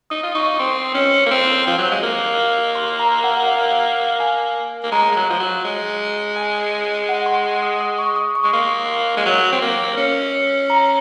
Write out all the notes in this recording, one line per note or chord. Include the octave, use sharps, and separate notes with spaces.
D#4 D#6
F4
D#4 C#6
C4 C6
C#4
A#3
C4
F3
F#3
G#3
A#3
C6
A#5
F#5
F5
G#5
A#3
G#3 A#5
G#3
F#3
F3
F#3
G#3
G#5
F#5
C6
C6
D#6
D#6
C#6
D#6
C#6
G#3
A#3 C6
G#3
F#3
C4
A#3
C#4
A#5